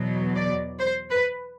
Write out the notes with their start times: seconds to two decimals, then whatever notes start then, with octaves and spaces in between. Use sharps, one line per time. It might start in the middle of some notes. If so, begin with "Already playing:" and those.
Already playing: E2 B2 F#3
0.35 D5
0.79 C5
1.10 B4